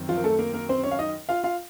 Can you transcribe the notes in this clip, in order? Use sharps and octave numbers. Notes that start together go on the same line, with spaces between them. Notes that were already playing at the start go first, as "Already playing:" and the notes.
Already playing: F#2 D#3 C4
F3 F4
A#4
A3 A4
A#3 A#4
A#3 A#4
C4 C5
C#4 C#5
F5
D#4 D#5
F4 F5
F4 F5